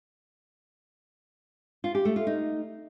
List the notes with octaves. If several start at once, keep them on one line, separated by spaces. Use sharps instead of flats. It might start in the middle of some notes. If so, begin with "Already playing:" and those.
F4
G4
A3
F4
D#4